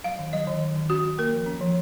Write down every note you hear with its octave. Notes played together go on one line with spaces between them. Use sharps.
F#3 F5
D#3
F#3 D#5
D#3
F#3
D#3
C#4 F#4
C#4
A#3 A#4
F3
C#4
F3